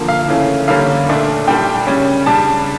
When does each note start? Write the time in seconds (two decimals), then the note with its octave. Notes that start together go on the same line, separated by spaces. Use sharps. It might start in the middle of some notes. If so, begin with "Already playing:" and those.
Already playing: D3 F3 A#3
0.09 F5
0.28 C#3 E3 A3 C#4
0.68 D3 G3 A#3 C#4 F5
1.07 A#2 A3 D4
1.47 A#2 G3 D4 G5
1.87 C#3 G3 C#4
2.26 C#3 G3 D4 A5